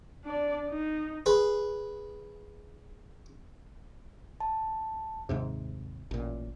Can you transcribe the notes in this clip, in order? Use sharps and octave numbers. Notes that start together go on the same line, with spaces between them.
D4 D5
D#4
G#4 B4
A5
D#2 G#2 C3
A1 A#2